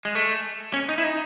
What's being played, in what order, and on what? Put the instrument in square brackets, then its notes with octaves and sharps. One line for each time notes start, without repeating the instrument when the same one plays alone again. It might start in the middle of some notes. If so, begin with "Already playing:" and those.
[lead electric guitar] G#3
A3
C#4
D#4
E4
D#4